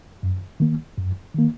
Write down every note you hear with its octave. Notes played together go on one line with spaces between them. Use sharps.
F#2
D#3 A#3
F#2
D#3 A#3